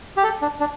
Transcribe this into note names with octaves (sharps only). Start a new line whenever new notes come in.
G4
A4
D4
D4